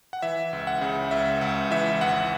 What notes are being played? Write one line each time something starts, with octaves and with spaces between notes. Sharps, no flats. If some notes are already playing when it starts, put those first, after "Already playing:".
F#5
E3 E5
C#2
F#5
C#3
C#2 E5
C#2 F#5
E3 E5
G#1 F#5